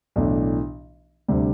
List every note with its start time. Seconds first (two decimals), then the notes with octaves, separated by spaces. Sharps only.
0.16 B1 A2 E3 A3 D4
1.28 D2 C3 G3 D4